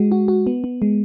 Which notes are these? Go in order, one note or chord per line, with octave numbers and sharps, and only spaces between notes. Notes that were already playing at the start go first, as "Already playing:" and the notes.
Already playing: G#3 F#4
F#4
F#4
B3
B3
G#3